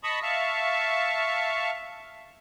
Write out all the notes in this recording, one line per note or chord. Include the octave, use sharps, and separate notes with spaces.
D#5 A5 B5 C#6 D#6
E5 F5 A5 C#6